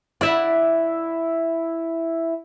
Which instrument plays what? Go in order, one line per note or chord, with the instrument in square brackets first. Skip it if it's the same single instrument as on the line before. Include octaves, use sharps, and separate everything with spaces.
[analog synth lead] E4 [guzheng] D5 E5 F#5